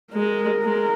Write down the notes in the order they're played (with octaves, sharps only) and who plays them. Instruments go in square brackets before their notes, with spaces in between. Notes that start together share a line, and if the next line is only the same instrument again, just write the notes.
[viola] G#3 [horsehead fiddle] A#4
[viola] G#3